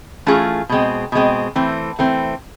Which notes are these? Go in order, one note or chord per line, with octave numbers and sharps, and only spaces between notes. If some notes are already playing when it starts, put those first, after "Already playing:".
E3 A3 C#4 F4 G#4
B2 G#3 C4
B2 G#3 C4
E3 A3 C4
E3 A3 C4